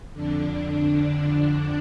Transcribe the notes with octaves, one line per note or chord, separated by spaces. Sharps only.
F2 D3 D4
D4